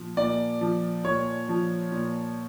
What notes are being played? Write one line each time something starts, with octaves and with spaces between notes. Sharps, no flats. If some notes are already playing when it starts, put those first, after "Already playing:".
Already playing: A#2 F3
A#2 D5
F3
A#2 C#5
F3
A#2